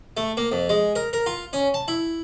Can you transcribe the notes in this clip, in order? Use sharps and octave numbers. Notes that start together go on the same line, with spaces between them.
A3
A#3
F2
G#3
A#4
A#4
F4
C#4
A5
E4